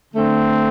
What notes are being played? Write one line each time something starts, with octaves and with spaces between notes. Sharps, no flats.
D3 A3 C4